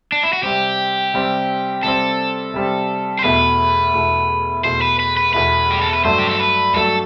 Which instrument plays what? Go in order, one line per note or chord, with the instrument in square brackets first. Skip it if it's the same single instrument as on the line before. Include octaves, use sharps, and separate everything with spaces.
[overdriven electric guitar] D4
E4
F#4
[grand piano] C3 G3 C4 [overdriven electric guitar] G4
[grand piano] C3 G3 C4
[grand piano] C3 G3 C4 [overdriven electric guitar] A4
[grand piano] C3 G3 C4
[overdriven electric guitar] C5
[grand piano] E2 B2 A3 E4 [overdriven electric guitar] B4
[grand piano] E2 B2 A3 E4
[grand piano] E2 B2 A3 E4 [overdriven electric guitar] C5
[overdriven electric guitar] B4
B4
B4
[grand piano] E2 B2 A3 E4 [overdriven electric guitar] B4
[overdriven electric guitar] G4
A4
B4
[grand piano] G2 F#3 A3 [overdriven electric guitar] C5
[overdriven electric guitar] G4
A4
B4
[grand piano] G2 F#3 A3 [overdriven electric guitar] A4